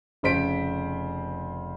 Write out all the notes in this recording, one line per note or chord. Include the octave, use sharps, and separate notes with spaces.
F1 C#3 C5 B6 D7